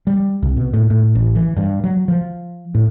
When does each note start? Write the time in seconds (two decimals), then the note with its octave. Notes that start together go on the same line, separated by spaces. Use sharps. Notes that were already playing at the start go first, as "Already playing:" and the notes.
0.07 G3
0.43 C2
0.57 B2
0.74 A2
0.90 A2
1.15 A1
1.35 E3
1.57 G2
1.84 F#3
2.08 F3
2.75 A2